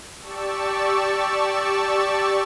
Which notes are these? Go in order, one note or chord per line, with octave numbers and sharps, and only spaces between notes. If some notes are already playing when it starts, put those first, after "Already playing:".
G4 D5 A5 C#6 E6